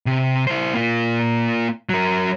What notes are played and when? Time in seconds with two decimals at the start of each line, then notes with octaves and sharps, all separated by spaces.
0.06 C3
0.47 E4 C5
0.74 A#3 F4
1.89 F#3 A#4